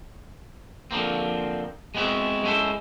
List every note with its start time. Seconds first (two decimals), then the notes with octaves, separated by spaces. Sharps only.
0.91 D3 F3 A#3 C4
1.95 G#3 B3 C4 E4 F#4
2.44 G#3 C#4 E4 A4 C5